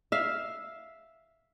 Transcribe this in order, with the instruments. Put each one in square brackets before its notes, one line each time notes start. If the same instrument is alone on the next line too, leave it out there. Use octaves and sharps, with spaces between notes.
[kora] E5 F5